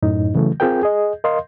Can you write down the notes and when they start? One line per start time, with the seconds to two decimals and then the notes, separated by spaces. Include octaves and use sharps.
0.03 F#2 A2 D#4
0.35 C#3 E3 F#3 A3
0.60 C4 F4 G#4 A#4 G5
0.83 G#4 D#5
1.24 A#4 D#5 F5 C6